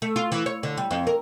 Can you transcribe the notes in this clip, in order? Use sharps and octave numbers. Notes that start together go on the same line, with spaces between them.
A3
F4
E3
C#5
D3
G3
F2
A#4